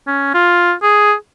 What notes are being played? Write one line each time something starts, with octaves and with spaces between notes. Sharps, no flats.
C#4
F4
G#4